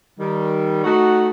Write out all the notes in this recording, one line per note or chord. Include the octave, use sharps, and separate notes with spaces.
D#3 G3
A3 D#4 F#4